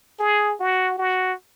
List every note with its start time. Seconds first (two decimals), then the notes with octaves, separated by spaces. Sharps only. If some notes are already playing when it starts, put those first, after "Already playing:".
0.20 G#4
0.60 F#4
0.98 F#4